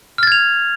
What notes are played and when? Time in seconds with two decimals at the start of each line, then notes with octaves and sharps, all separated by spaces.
0.18 F6
0.23 A6
0.27 G#6
0.32 F7